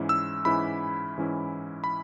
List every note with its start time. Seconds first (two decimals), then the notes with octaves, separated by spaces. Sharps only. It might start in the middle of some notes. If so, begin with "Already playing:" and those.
Already playing: G#2 E3 C#4 E4
0.09 E6
0.45 G#2 E3 C#4 E4 B5
1.18 G#2 E3 C#4 E4
1.84 B5